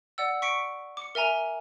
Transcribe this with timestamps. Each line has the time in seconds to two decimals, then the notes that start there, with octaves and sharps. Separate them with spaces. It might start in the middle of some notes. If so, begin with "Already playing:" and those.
0.18 D5 F#5 E6
0.42 C#6 B6 C#7 D7
0.97 D6 C#7
1.15 A#4 E5 G#5 A#5